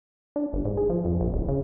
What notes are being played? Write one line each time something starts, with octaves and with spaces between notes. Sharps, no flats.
D4
G1
G#2
G#4
F3
F2
A#1
D1
C#3